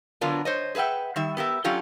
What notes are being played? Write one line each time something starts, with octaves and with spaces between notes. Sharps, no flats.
D3 F#3 B3 D4 F4 A#4
C5 C#5 D#5
G#4 B4 E5 F#5 G5
D#3 G3 E5
B3 G4 A#4 E5
F#3 C#4 D4 F4 G4 A4